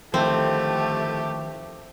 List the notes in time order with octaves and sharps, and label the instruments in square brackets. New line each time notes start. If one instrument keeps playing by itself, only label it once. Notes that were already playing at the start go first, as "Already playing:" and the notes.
[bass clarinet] D3 [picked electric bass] D#3 F3 [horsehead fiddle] A3 G4 [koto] C4